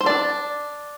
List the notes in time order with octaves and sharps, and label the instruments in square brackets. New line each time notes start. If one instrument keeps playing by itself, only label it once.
[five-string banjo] C5
D4 D5